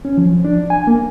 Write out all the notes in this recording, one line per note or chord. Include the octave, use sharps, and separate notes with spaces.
C#4
F3
D4
G#5
A#3